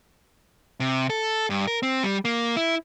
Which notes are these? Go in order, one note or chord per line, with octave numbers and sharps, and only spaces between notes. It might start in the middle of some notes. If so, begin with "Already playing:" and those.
C3
A4
G2
A#4
C4
G3
A#3
E4